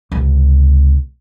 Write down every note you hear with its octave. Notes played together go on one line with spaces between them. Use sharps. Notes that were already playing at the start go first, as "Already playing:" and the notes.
C#2 C3